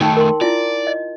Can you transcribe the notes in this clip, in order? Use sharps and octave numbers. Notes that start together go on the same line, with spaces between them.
D#3 A3 D#4 G5 A5
A#4 C6
E4 F4 D5
D#5